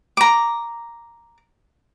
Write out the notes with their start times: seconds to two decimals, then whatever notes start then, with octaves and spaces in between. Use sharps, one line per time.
0.17 A#5 D6